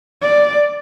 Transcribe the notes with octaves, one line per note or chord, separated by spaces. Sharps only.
D5